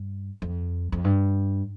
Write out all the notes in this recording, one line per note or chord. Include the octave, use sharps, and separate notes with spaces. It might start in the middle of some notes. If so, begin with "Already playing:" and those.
Already playing: G2
F2
F2
G2